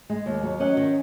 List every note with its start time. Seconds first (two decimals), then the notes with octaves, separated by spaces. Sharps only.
0.10 G#3
0.26 D#2
0.43 F#3
0.60 C#4 D#5 F#5
0.77 D#3